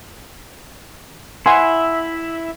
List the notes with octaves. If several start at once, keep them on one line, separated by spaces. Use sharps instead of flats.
E4 E5 F#5 G#5 C6